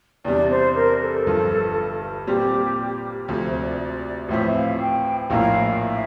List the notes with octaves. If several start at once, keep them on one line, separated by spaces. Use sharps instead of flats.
E2 C3 G3 D4 D5
C5
A#4
A4
G1 G2 F3
A#2 G3 C4 G4
D2 C3 F3 A4
C5
D5
D5
A1 A2 F3 C4 E5
F5
G5
A#1 A2 F3 A#3 E4 F5
E5